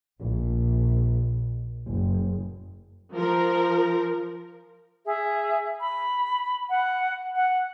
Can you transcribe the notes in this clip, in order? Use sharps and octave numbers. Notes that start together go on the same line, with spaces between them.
A#1
F#1
F3 A#4
G#4 E5
B5
F#5
F#5